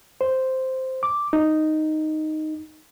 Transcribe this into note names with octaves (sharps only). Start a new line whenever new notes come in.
C5
D6
D#4